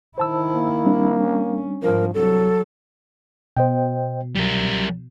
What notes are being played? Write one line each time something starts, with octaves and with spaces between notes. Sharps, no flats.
D#3 E4 C5 A5 E6
A#3
G3 C4 D4
C#4
G#2 F3 A#4
C2 F#3 A4
B2 C5 D#5 G5
C2 F#3 G3 A#4